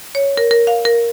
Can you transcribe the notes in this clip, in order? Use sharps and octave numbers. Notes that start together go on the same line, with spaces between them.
C#5
A#4
A#4
F5
A#4